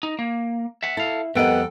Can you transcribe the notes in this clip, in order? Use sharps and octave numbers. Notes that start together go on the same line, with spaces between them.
D#4
A#3
E5 F#5
E4 A4 F5
F2 G3 B3 A4 A#4 D#5 F#5 G5